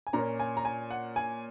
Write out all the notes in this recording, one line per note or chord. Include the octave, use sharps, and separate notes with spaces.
G#5
A#2 A#3 C#4 A#5
G#5
A#5
G#5
F#5
G#5